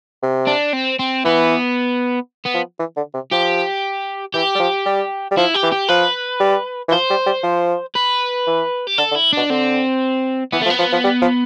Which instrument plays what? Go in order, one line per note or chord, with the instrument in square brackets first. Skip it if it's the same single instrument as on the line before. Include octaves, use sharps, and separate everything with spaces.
[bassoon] C3
[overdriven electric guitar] D4
C4
C4
[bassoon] E3 [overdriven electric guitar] B3
[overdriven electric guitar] B3
[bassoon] F3
E3
D3
C3
[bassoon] F3 [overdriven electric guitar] G4
[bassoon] E3 [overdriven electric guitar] G4
[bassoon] G3
F3
G3
G3
[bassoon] F3 [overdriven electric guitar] E4
[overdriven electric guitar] G4
[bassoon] E3
[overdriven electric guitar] G4
[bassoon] F3 [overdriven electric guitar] B4
[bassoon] G3
E3
[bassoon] F3 [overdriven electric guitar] C5
[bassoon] G3
G3
F3
[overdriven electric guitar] B4
[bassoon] E3
[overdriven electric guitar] G4
[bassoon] D3 [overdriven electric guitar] A4
[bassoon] D3
[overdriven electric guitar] E4
[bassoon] B2 [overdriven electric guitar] D4
[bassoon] D3 [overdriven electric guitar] C4
[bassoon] E3 [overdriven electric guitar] B3
[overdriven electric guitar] A3
[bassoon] F3
[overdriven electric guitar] B3
[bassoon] F3
F3
G3
F3